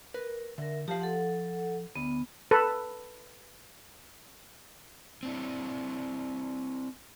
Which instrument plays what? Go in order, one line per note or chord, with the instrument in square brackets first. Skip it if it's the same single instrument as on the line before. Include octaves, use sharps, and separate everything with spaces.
[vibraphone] A#4 [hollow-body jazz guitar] B4
[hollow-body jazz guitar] D3 [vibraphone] A#4 E5
[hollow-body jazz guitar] F3 F5 [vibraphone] G4 A5
[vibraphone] A4 F#5
[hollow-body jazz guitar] D2 [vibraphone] B3
[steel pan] A4 B4
[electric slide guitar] C4 D4 E4